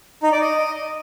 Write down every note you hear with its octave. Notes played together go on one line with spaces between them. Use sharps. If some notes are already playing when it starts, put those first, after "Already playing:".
D#4
D5
D#5